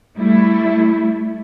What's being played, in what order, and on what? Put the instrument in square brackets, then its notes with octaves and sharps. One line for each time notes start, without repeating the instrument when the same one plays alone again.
[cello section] G3 A3 E4